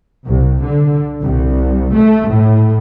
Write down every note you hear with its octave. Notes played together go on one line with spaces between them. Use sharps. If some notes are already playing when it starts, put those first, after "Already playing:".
C2
D3
C2
A3
A2